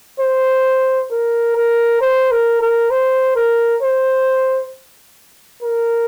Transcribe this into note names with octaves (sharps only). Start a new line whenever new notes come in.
C5
A#4
A#4
C5
A#4
A#4
C5
A#4
C5
A#4